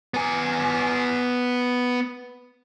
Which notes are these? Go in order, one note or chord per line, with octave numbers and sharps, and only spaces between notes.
B3 G#5